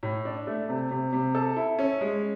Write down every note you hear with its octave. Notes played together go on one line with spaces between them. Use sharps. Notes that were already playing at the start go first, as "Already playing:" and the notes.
A2
D4
A3
C3
C3
C3
A4
E4
C#4
G#3